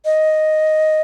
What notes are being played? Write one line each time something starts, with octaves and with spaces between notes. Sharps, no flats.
D#5